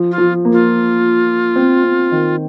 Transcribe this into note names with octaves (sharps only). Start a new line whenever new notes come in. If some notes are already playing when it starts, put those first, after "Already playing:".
Already playing: F3
F4
F3
A#3
F4
C4
C4
D#3